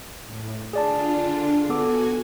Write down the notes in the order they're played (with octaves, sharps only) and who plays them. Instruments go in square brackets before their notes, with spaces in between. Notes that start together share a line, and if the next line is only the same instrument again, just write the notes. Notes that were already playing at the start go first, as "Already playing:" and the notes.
[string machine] A2
[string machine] D3 D4 F4 [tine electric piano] G#4 D5 A5
[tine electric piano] B3 A4 D6 [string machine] F#4 G#5